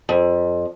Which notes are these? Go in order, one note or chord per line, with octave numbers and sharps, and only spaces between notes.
F2